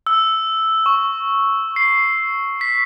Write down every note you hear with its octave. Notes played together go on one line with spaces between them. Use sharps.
E6
C#6
C7
B6